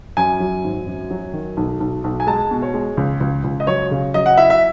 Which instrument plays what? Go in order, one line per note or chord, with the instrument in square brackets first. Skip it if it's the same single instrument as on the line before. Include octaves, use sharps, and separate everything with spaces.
[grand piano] F#2 [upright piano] G#5
[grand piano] F#3
G#1
F#2
F#3
D#3
B1
B1
B1
[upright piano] G#5
[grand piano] G#3 [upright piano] A5
[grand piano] B2
[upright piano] C#5
[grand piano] G#3
C#2
C#2
C#2
[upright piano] D#5
[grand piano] F#3 [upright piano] C#5
[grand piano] C#3
[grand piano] F#3 [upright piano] D#5
[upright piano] F#5
[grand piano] E4 [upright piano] E5
[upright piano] E5